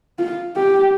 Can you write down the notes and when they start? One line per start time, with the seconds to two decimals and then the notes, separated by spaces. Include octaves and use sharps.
0.19 F4
0.56 G4